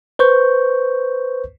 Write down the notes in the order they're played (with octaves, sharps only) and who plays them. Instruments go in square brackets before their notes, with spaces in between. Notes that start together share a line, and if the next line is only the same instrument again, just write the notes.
[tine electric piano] B4 C5 C#6 G6